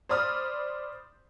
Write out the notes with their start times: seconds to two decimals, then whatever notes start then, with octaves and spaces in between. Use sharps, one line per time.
0.09 C5 D5 B5 D#6 F6